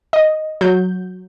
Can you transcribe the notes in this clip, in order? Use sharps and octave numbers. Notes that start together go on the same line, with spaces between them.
D#5
F#3 G6